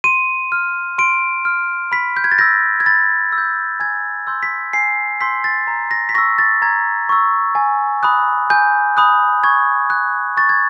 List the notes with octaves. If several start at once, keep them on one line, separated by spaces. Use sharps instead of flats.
C6 D#7
F6
C6 D7
F6
B5 B6
G6
G#6
A6
E6 G6 A#6
G#6
B5 A6
E6
G6
G#5 G#6
C6 E6 G6
B6
G#5 C7
C6 E6 G6 B6
A6
A#5
A#6
B6
C#6 E6 A#6
A6
A#5 G#6
C#6 E6
G#5
B5 D#6 F#6
G#5 G6
B5 D#6 F#6
C#6 G#6
F#6
C#6 A6
G#6